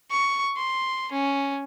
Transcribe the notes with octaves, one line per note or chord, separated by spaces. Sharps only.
C#6
C6
C#4